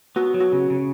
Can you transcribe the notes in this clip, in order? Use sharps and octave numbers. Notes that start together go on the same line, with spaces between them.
B3 F#4
F#3
F#4
C#3
C#3